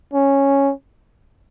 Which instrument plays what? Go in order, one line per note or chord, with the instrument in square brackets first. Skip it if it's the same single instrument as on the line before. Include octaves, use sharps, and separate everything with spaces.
[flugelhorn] C#4